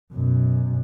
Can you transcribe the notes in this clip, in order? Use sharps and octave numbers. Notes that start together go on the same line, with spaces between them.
F#2 B2